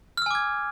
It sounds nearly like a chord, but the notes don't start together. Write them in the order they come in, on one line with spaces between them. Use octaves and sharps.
F6 E6 G#5 D6 G#6